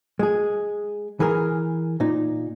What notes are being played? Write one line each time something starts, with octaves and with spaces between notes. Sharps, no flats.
G#3 G#4
E3 G#4 A#4
A#2 D#4